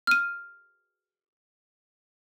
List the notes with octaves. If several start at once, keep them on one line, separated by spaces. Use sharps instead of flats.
F6 D#7